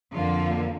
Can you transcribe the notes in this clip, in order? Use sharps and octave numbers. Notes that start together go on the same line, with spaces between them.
F2 D3 F3 A#3 F4